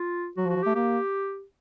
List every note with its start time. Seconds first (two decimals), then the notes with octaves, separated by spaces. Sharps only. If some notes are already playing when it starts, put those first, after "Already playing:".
Already playing: F4
0.37 F#3 F#4
0.46 F3
0.50 F#4
0.56 F3
0.63 G4
0.66 A3
0.75 A#3 G4